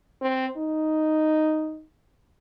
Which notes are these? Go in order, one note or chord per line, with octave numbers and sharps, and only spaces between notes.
C4
D#4